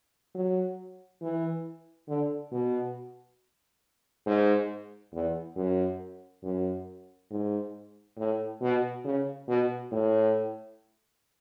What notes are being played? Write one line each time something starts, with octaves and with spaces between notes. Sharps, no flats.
F#3
E3
D3
B2
G#2
E2
F#2
F#2
G#2
A2
B2
C#3
B2
A2